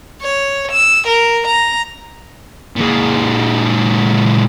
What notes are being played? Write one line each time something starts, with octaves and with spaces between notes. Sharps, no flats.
C#5
E6
A#4
A#5
A#2 G#3